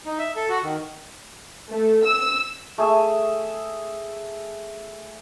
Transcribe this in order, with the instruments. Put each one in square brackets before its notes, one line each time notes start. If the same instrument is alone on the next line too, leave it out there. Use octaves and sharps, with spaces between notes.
[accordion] D#4
E5
A4
F#4
D#3
[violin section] A3
E6
[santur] A3 G#4 E5